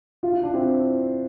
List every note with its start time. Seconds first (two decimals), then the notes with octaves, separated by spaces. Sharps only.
0.23 F4
0.33 E4
0.43 D4
0.54 C4 E4